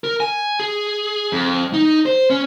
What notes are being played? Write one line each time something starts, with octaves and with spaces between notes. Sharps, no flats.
A#4
G#5
G#4
F2
D#4
C5
C#4